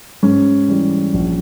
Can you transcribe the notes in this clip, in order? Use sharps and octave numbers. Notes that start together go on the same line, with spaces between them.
G#2 C#4
E3 G3
A#1